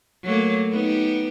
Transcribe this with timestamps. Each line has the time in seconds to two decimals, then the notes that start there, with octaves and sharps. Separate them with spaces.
0.24 F#3 A3 A#3
0.71 B3 D#4 G4